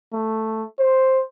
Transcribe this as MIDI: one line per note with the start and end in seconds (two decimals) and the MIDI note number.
0.13 0.64 57
0.79 1.23 72